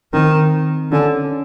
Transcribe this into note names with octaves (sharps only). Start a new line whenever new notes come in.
D#3 C4
D3 C#4